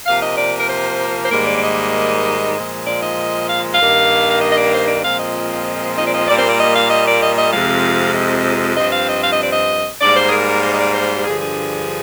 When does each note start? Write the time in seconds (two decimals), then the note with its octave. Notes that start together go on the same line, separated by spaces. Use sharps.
0.06 C3 F3 A#3 F5
0.22 D#5
0.37 D5
0.59 A#4
0.69 C5
1.23 C5
1.30 G#2 D#3 G3 A#3 A#4
1.47 D5
1.57 D5
1.62 D#5
2.55 A#2 F3 G#3
2.86 D5
3.02 D#5
3.48 F5
3.74 F5
3.79 G2 D#3 A#3
4.31 F5
4.41 D#5
4.52 D#5
4.57 D5
4.73 C5
4.88 D5
5.03 A#2 F3 G#3 C4 F5
5.19 D#5
5.97 D#5
6.06 D5
6.13 D#5
6.28 A#2 G3 A#3 D5
6.38 C5
6.49 D5
6.59 D#5
6.75 F5
6.90 D#5
7.06 D5
7.21 D#5
7.37 D#5
7.53 F2 C3 F3 G#3 F5
8.14 D#5
8.76 G2 F3 C4 D#5
8.92 F5
9.08 D#5
9.23 F5
9.32 D#5
9.43 D5
9.52 D#5
10.01 G#2 G3 A#3 D5
10.16 C5
10.28 G#4
10.32 A#4
10.48 A#4
10.63 C5
10.72 D#5
10.79 D5
10.94 C5
11.17 G4
11.25 G2 D3 F3 G#4
11.41 G#4